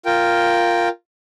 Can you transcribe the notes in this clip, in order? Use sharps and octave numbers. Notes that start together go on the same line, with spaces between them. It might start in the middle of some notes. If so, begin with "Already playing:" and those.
F4 A#4 G5